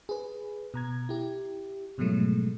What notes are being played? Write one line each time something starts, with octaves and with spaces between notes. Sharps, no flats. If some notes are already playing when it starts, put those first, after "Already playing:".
G#4 B4
B2 A#5 G#6
E4 G4
G#2 B2 F3 F#3 G#3 A3